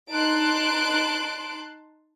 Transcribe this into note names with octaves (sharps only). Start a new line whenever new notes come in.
D#4 A5 C6 F#6 D7